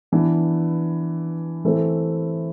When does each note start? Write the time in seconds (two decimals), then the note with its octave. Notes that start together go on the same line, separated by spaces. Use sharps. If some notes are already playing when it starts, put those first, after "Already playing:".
0.12 E3 B3 D4
1.65 E3 A3 C4